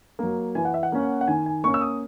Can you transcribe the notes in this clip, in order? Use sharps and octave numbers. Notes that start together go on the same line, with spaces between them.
F#3 A#3
E3 G#5
F#5
E5
F#5
A#3 C#4
F#5
D#3 G#5
G#5
A#3 C#4 C#6
E6
D#6